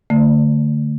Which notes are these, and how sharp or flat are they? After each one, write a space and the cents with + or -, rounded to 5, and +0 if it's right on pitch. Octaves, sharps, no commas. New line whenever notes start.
D3 -5 A3 +30